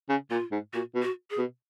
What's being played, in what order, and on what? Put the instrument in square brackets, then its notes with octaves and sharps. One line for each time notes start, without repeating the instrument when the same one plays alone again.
[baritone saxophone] C#3
[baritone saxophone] A#2 [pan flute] F4
[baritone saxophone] G#2
[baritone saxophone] A#2 [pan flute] F#4
[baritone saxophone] B2
[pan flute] F#4
G#4
[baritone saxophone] B2